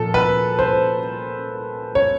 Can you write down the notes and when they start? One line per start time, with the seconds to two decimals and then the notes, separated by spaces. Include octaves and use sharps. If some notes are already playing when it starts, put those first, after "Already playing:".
Already playing: A#2 F3 A4
0.14 B4
0.59 C5
1.95 C#5